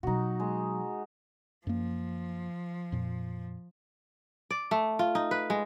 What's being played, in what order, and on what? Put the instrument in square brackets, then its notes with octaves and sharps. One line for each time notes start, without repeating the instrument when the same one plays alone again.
[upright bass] B2 F#3 [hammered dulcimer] D#4 F#4
[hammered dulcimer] G#3
[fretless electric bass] F#2 A#3 [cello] F3
[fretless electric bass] F2 A#2
[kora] D5
A3
F4
D#4
B4
G#3